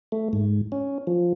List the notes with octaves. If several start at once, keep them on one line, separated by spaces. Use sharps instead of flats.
A3
G#2
C#4
F3